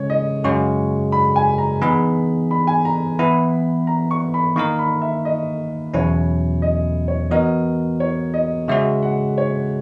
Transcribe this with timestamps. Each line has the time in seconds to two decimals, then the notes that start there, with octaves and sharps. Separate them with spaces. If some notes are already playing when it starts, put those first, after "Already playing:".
Already playing: C#3 G#3 C#4 C#5
0.10 D#5
0.44 F#2 C#3 G#3 C#4 F#4 C#6
1.12 B5
1.36 G#5
1.58 A#5
1.81 E3 B3 D#4 G#4 B5
2.51 B5
2.67 G#5
2.85 A#5
3.19 E3 B3 E4 B5
3.87 A#5
4.11 C#6
4.34 B5
4.56 D#3 A#3 D#4 A#4 C#6
4.79 B5
5.02 E5
5.25 D#5
5.94 E2 B2 F#3 C#4 E4 C#5
6.62 D#5
7.08 C#5
7.31 E3 B3 F#4 A#4 D#5
8.00 C#5
8.34 D#5
8.68 C#3 G#3 C#4 F#4 E5
9.03 F#5
9.38 C#5